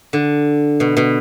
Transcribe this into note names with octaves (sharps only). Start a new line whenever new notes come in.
D3
B2
B2